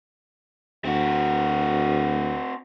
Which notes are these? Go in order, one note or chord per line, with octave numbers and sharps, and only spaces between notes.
D2 C4 F#4